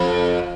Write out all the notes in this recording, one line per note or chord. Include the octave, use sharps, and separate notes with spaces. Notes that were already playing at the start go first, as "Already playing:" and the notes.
Already playing: F2